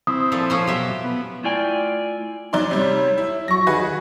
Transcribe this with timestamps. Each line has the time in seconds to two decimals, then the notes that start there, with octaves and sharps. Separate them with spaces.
0.07 C4 E4 D#6
0.32 A#2 F3 A4
0.50 F3 C#4 C5
0.67 B2 F#3 G4 E5
1.04 B3
1.44 A3 E4 F4 D5 G5 G#5
2.53 F#3 D#4 D5 C6
2.71 C3 G3 C#5
3.18 E4
3.48 F#3 C#6 A#6
3.67 D#3 F#4 G#4 B4